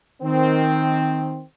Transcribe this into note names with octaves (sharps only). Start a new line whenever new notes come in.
D#3 C4